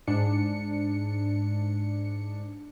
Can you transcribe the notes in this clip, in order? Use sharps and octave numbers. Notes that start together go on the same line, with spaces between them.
G#2 D4 C#7